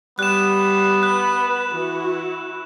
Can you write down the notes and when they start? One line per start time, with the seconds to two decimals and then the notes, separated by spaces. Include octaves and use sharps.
0.19 G3 B3 F#6 E7
1.03 B4 B5 F#6
1.73 E3 E4 F#4